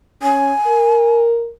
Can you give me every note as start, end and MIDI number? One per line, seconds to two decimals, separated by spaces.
0.23 0.53 61
0.23 1.21 80
0.67 1.49 70